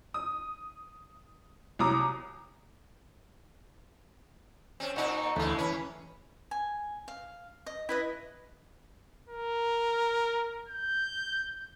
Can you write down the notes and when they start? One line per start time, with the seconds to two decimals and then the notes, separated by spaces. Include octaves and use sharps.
0.14 D#6
1.79 C2 F#3 A#5 D6 D#6
4.80 C4 C#4
4.96 A#2 C4 D#4 C#6
5.36 D2 C#3 E3 G#3 A3
5.58 E3 C#4 B4
6.51 G#5
7.08 F5
7.66 D#5
7.89 E4 B4 D#5
9.29 A#4
10.68 G6